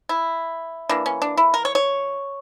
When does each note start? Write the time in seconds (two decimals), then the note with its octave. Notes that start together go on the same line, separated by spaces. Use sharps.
0.09 E4
0.89 E3 A#3 D4
1.06 C#4
1.22 D4
1.37 E4
1.54 A#4
1.65 C#5
1.75 C#5